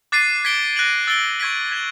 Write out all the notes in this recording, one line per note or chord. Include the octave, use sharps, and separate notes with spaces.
D6 F#6 A6 C7 D#7
G#6 B6 D7 G7
F#6 A#6 D#7 F#7
E6 A6 D7 G7
C#6 E6 G#6 B6 D#7
G#6 B6 E7 G7